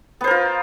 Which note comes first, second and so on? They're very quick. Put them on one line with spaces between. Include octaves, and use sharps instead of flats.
B3 C5 A#4 F4